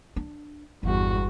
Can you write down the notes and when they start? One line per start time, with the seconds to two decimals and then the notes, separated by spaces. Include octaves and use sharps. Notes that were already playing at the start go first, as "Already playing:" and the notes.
0.16 D4
0.83 G1 E2 G2 F#4